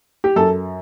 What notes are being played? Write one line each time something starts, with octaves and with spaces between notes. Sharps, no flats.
G4
F#2 A4